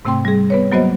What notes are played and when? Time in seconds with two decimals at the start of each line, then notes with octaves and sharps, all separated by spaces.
0.05 G#2 C3 A3 C4 G5 C6
0.25 G3 G#4
0.50 B3 B4 C#5
0.72 F#3 A#3 B3 F#4 C5 D#5